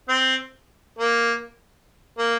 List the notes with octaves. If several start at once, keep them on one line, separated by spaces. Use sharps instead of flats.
C4
A#3
A#3